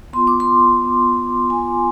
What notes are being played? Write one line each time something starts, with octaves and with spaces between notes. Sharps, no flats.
B3 F4 C6
D6
C6
B3 F4
B3 F4 G#5